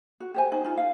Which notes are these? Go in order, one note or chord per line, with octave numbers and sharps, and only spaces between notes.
F#4
G4 C5 G#5
D#4 C5
D#4 F4
F5